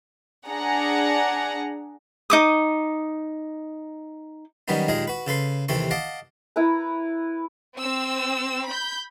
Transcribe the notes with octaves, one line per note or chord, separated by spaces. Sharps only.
D4 G#4 F#5 A#5
D#4 D6 D#6
D#3 F#3 G3 B3 C#4 D#4
D#2 A#2 D#3 G#3 G#4 A#5
F#4 B4
C#3 A4 B4 C6
D#2 C3 E3 C4 A4 C#6
D#5 F5 F#5 A5 D6
E4 B4 A#5
C4 E6
B5 G6